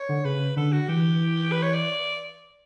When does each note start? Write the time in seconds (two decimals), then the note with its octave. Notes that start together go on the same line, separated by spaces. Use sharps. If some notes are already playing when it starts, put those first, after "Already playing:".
Already playing: C#5
0.09 D3
0.24 C#3 B4
0.56 D3 A4
0.72 F#4
0.89 E3 G4
1.52 B4
1.62 C#5
1.74 D5